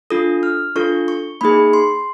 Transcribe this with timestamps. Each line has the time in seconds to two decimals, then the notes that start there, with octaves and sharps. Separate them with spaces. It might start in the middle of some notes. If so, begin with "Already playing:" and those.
0.10 D4 F4 A4 D#6
0.43 F6
0.76 D4 F4 A4 C#6
1.08 C#6
1.41 A#3 D#4 G#4 B5
1.73 C6